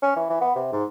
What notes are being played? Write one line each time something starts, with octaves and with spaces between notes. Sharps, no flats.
C#4
E3
E3
B3
C3
G#2